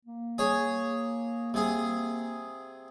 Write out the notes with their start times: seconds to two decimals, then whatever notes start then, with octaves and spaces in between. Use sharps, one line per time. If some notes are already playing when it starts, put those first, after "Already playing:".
0.05 A#3
0.38 G#4 C#5
1.54 C3 G#4